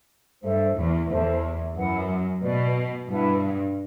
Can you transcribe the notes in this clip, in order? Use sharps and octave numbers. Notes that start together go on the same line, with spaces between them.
G2 A4 C5 E5
E2
E2 A4 C5 E5 A5
F#2 E4 B4 F#5
B2 F#4 B4 D5
G2 E4 B4 F#5 A5